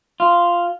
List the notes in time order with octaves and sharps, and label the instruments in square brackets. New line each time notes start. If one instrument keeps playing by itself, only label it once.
[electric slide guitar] F4